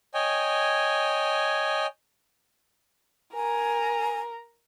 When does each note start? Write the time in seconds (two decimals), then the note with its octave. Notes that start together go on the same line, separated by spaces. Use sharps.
0.14 C#5 D#5 G5 G#5
3.34 A#4 G#5 A#5